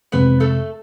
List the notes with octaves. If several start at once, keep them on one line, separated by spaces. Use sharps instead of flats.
F2 C3 G#3 B3 C4 B4
A3 A4